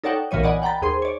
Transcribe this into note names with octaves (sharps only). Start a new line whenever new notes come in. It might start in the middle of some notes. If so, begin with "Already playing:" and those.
D#4 A4 C#5 D5 F#5 G5
B1 A#2 E3 C#5 D#7
D5 D#5 F#5 G#5 B5
F#5 G5 A#5 B5 A6
D#2 G#4 C5 C6
C#5 D5